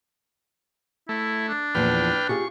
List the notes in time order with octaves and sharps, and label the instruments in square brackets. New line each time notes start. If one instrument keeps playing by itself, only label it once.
[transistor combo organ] A3 [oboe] E4
[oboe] D4
[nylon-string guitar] E2 A#2 F3 [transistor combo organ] B4 G5 F6
[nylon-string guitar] F4 G4 G#4 [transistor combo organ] C#6